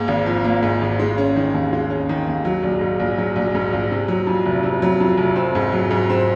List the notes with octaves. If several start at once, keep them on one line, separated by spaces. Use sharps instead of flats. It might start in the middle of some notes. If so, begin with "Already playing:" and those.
Already playing: G#2 A#3
G#1
F3
A#3
G#2
G#1
G#3
C#4
D#3
D#2
G#3
C#4
D#3
D#2
F#3
A#1
G#2
A#1
F#3
A#1
G#2
A#1
C3
F#3
F2
F1
C3
F#3
F2
F1
C4
G#2
F#3
G#2
C4